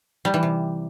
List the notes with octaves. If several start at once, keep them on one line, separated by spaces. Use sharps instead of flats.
G3
E3
C3